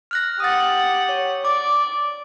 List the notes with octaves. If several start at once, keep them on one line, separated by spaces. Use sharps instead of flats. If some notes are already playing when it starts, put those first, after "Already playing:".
F6 F#6 A#6
G4 F#5 D#6 A6
C#5
D5 D6